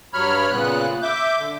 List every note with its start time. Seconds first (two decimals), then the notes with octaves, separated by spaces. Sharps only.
0.14 G2 F#3 C#5 B5 F6
0.51 A#2 C#3 B3 F#6
1.03 E5 D6 G6
1.38 D3